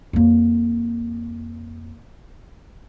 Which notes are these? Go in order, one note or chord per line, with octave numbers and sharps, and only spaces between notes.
F2 A#3